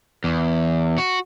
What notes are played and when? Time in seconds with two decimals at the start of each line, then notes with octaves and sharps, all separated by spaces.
0.24 E2
0.98 F#4